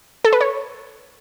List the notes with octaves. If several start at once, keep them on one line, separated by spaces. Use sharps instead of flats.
A4
B4
C#5